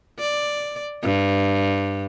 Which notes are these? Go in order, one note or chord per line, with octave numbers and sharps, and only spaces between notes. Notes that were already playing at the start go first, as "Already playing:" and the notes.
D5
G2